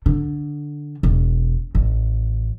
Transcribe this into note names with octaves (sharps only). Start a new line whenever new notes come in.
D3
E1
A1